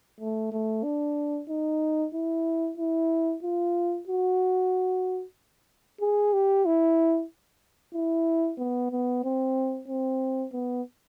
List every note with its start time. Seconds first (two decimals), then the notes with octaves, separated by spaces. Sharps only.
0.20 A3
0.52 A3
0.84 D4
1.49 D#4
2.14 E4
2.78 E4
3.43 F4
4.07 F#4
6.01 G#4
6.33 G4
6.66 E4
7.95 E4
8.59 B3
8.92 B3
9.24 C4
9.88 C4
10.53 B3